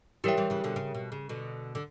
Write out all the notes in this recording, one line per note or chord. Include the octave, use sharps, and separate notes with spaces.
E3 G3 G4 A#4 C#5 E5 G5
E3 G3
C#3 E3
B2 D3
C#3
B2
C#3
B2 D3
D3